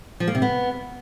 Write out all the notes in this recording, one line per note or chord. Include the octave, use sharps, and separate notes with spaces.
F3
A#3
C3
B3